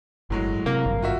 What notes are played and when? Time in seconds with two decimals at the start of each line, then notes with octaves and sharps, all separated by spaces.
0.30 G1 A2 F#3 G#3
0.66 C3 A#3
0.86 G#1 G2
1.02 F4 F#4 E5